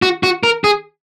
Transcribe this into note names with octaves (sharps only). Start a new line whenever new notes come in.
F#4
F#4
A#4
G#4